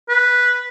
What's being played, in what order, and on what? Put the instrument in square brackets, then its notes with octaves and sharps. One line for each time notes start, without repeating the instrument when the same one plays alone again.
[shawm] B4